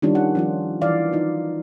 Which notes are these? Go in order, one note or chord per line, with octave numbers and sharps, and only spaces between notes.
D#3 G3 C#4 D4 F4
F#5
F3 C#4 F4
E3 D5 F5
D#4 F4